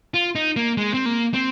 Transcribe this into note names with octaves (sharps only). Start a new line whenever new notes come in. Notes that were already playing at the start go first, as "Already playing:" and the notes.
F4
D#4
A#3
G#3
C4
A#3
C4